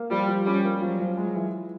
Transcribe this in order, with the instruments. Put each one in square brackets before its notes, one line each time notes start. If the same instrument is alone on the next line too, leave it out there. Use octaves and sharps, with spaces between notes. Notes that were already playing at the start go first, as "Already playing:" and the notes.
Already playing: [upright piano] A#3
[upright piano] F3 [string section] G3
[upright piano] F3
[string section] G3 [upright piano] C#4
[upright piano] A#3
[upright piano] F3 [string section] F#3
[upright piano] F3
[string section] F#3 [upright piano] G#3
[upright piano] E3